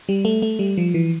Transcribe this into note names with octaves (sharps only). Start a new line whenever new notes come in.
G3
A3
A3
G3
F3
E3